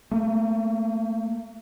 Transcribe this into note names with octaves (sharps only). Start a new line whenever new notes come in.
A3 A#3